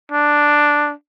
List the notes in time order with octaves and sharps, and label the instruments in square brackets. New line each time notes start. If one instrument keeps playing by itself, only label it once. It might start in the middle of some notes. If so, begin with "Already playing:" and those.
[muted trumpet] D4